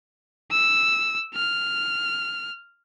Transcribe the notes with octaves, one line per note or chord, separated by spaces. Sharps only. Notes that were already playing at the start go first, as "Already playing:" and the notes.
E6
F6